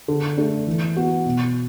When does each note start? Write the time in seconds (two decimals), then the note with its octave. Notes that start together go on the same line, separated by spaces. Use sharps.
0.08 D3
0.37 A3 D4
0.67 E3
0.96 B3 F#4
1.26 B2